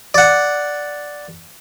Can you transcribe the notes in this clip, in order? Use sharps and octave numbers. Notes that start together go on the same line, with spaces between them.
D5 F#5